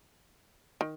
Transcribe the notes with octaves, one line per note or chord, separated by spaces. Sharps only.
D#3